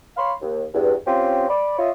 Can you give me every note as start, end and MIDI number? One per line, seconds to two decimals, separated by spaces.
0.17 0.33 73
0.17 0.33 77
0.17 0.33 83
0.17 0.33 84
0.41 0.62 39
0.73 0.94 40
0.73 0.94 43
1.06 1.46 60
1.06 1.46 61
1.06 1.46 65
1.06 1.46 67
1.49 1.76 74
1.49 1.76 83
1.78 1.90 65
1.78 1.90 73
1.78 1.90 75
1.78 1.90 76